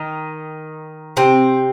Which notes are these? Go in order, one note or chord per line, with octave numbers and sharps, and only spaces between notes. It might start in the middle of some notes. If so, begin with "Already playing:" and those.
Already playing: D#3 D#4
C3 C4